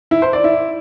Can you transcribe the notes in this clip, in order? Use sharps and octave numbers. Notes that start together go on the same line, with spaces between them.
E4
C5
D5
E4